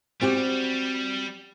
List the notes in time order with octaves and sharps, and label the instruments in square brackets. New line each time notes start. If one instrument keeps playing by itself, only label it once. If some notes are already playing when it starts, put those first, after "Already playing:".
[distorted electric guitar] G3 [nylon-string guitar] C4 F#4 G4